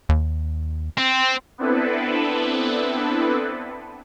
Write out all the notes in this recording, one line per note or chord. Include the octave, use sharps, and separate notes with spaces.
D#2
C4
B3 C4 D4 E4 A4 B4